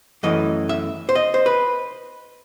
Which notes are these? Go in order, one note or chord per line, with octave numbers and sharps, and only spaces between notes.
F#2 E3 A3 D#5
E5
C5
D#5
C5
B4